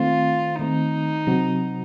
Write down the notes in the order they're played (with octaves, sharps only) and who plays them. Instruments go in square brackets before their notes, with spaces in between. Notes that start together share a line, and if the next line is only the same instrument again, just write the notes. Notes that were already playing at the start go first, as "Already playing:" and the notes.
Already playing: [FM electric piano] D#3 A3 C4 [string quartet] F4
[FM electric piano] D#3 A3 C4 [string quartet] D#4
[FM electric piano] C3 F#3 C4 F#4